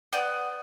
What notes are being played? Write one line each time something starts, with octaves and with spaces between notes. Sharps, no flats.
B3 D5 G5